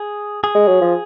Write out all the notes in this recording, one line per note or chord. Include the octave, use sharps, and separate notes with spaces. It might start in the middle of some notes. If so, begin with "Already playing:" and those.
Already playing: G#4
G#4
G#3
F#3
F3